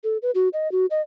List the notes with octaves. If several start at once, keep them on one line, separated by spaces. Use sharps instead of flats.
A4
B4
F#4
D#5
F#4
D#5